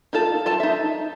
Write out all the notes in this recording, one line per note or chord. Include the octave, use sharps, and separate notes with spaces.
D#4 F4 A4 A5
F4 A4 A5
D#4 E5